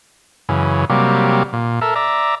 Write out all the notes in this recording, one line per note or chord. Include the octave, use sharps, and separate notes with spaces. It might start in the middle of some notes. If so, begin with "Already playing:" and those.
F#2 C#3 E3
C3 F#3 G3 A#3
A#2
A4 A#4 E5
D5 E5 A#5